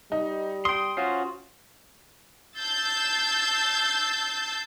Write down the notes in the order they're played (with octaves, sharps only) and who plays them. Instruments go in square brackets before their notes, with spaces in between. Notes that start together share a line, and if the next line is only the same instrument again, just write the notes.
[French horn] G3 [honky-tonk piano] D#4
[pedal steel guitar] G5 C6 [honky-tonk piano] D#6
[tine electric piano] C#4 F4 F#4 [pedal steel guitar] C5
[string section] A5 E6 G6 A6 C7